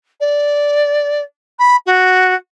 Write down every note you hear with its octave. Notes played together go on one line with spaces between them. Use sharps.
D5
B5
F#4